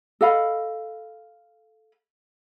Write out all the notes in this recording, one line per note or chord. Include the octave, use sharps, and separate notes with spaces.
A4 D#5 F5 B5